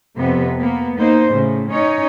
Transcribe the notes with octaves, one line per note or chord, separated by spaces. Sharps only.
F2 C3 B3
A#3 B3
A#3 D#4 C5
A2 C#3
C#4 D#4 C#5